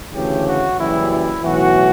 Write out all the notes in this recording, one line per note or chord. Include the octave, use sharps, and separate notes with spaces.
D2 C#3 E3 A3 G4
F#4
F#1 F#2 E3 G3 E4
E4
B1 A2 E3 F#4